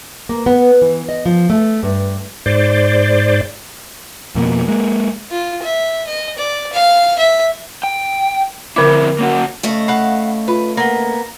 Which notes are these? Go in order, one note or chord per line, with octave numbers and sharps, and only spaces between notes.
A#3
B3
E3
D#5
F3
A3
G2
G#2 C5 D5
F2 B2 A#3
G#3 A#3
F4
E5
D#5
D5
F5
E5
G5
F2 D3 C4 E4 D6
A#3 C#4 F#4
C#3 A3 D#5
F5 F#5 B5
F4 B4
A#3 B3 A#6 G7